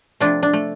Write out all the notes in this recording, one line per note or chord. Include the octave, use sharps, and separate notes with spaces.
C3 F3 A3 D4
D4
A3